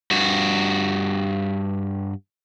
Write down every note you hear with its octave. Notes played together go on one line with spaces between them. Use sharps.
G2 F#4